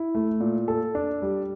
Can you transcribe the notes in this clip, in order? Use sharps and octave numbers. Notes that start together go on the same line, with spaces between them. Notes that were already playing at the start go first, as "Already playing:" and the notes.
Already playing: E4
A3
A#2
A4
D4
G3